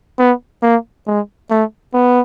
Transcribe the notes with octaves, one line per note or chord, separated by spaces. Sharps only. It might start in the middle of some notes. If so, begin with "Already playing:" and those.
B3
A#3
G#3
A3
B3